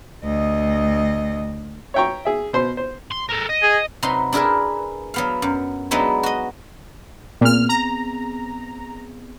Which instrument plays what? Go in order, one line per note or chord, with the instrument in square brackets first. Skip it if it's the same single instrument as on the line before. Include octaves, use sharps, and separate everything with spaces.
[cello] D2 D#5
[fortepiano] C#5 E5 G5 A#5 C#6
G#4 E5
B2 C5 C6
C5
[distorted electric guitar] C6
A4 A#4
D#5
[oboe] G#4
[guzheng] C3 F#3 D#4 B4 C6
D4 E4 G#4 A#4 B4
F#3 B3 F5
F#2
F#3 G#3 B3 D4 D#4 E5
F#4 D#5
[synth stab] A#2 F6 [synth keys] B3 C4 G#4
[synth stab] A#5